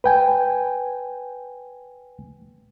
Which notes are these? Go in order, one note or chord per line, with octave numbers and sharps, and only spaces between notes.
B4 G5 G#5